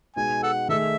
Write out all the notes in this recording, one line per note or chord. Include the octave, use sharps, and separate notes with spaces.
B2 G#3 D#4 G#5
A4 F#5
D#3 A3 D#4 G#4 A4 E5